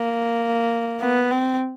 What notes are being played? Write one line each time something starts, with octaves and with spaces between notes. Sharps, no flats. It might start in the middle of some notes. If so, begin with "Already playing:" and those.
Already playing: A#3
B3
C4